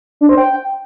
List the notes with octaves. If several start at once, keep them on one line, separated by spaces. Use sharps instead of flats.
D4
C5
G5